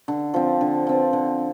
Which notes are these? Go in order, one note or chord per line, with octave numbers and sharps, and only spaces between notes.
D3
F3 C4
D3
F3 C4
D3